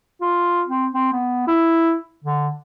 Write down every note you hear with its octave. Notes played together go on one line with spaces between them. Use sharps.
F4
C4
C4
B3
E4
D3